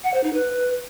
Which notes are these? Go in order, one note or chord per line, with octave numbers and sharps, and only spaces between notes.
F#5
C5
D#4
B4